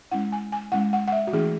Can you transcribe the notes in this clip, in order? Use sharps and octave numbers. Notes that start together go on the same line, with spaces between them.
G#3 C#4 E4 F#5
G#5
G#5
G#3 C#4 E4 F#5
F#5
F#5
E5
F#4
E3 A3 C#4 E4 G#4